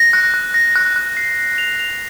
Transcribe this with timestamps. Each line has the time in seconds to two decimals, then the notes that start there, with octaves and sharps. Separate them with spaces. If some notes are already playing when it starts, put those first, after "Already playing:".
Already playing: A#6
0.13 F#6
0.34 F#6
0.54 A#6
0.76 F#6
0.96 F#6
1.17 C7
1.38 C7
1.58 F7
1.79 F7